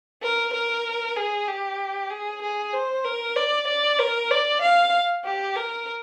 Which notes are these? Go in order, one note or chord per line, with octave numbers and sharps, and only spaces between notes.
A#4
A#4
G#4
G4
G#4
G#4
C5
A#4
D5
D5
A#4
D5
F5
G4
A#4